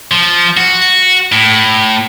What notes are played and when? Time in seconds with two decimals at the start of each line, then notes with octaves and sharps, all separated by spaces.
0.11 F3
0.57 F#4
1.32 A2